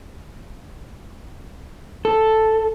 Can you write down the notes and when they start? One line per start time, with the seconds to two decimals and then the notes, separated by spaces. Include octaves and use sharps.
2.05 A4